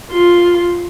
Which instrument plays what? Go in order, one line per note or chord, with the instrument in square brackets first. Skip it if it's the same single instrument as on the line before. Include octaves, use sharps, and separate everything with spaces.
[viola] F4 C6